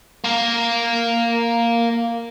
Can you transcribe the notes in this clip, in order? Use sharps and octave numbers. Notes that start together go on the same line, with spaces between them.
A#3 A#4